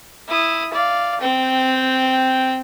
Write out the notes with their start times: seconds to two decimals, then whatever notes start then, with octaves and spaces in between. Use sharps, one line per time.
0.28 E4 D#6
0.73 D5 F5
1.20 C4 G5